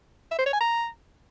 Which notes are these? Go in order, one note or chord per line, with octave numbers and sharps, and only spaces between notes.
E5
C5
C#5
G#5
A#5